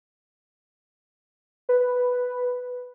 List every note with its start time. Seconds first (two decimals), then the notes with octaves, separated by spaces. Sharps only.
1.69 B4